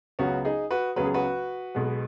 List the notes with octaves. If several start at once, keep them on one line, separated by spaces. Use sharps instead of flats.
C#2 C#3 F#3 B3 C#4 F#4
D#4 G#4
F#4 B4
C#2 C#3 F#3 B3 B4
G#4
F#4 B4
B1 B2 G#3 B3